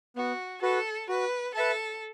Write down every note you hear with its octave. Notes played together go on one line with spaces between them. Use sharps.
B3 F#4
F#4 A4 B4
F#4 B4
A4 B4 E5 A5